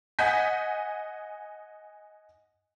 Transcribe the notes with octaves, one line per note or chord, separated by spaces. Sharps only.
D#5 F#5 G#5 G6 B6